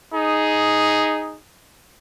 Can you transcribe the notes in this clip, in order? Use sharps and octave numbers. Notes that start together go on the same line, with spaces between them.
D#4 G#4